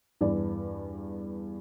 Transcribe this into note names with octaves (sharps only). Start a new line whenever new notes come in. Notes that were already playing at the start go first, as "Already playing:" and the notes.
E2 G2 D5